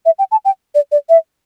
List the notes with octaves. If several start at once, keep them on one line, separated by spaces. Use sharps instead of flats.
E5
G5
A5
G5
D5
D5
E5